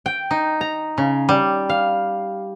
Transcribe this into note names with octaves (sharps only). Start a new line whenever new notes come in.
G5
D#4
A#5
C#3
G3
F5